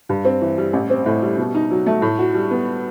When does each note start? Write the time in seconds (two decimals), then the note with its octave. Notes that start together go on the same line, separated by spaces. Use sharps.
0.09 G2
0.25 C4
0.41 E3
0.58 G3
0.73 A1
0.90 C4
1.06 A2
1.22 G3
1.38 B2
1.55 D#4
1.71 F#3
1.86 A3
2.02 A2
2.19 F#4
2.35 G3
2.51 B3